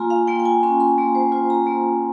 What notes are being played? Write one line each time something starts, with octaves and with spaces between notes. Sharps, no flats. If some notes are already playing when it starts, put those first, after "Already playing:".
Already playing: A#3 F4 G#5 A#5 C6
F5
A#3 G5
G5
G#5
C#4 C6
C6
A#3 A#5
C5
F4 C5
A#5
A#3